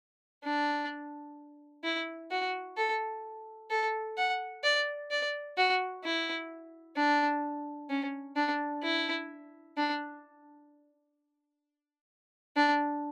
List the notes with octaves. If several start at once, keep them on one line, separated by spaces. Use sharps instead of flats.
D4
E4
F#4
A4
A4
F#5
D5
D5
F#4
E4
D4
C#4
D4
E4
D4
D4